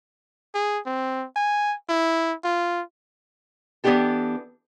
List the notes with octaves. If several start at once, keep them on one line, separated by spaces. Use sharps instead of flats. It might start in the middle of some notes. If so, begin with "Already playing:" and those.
G#4
C4
G#5
E4
F4
E3 B3 C#4 D4 G4 A4